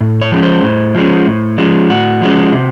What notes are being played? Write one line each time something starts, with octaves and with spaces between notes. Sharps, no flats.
A2
C#5
F3 G#3 C#4
C5
A2
F3 G#3 C#4
A2
F3 G#3 C#4
A2 F#4
F3 G#3 C#4
C3